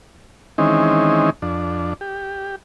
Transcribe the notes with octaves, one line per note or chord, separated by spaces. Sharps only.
D#3 E3 G#3 C4 C#4 D#4
F2 D4
G4